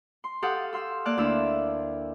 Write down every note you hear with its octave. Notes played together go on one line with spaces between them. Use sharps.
C6
G4 A4 F5 F#5 D#6
G4 F5 C6 E6
A#3 D5 A5 F6 F#6
D2 D4 E4 F5 C6 E6